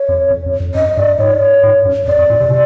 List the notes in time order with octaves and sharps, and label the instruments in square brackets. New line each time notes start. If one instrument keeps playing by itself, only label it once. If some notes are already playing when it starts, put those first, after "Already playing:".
Already playing: [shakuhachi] C#5
[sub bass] F2
F2
F2
F2
[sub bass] F#2 [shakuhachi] D#5
[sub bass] G2 [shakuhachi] D5
[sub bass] G#2 [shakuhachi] C#5
[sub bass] G#2
F#2
[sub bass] F2 [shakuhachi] D5
[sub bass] F2
A2
C3
C3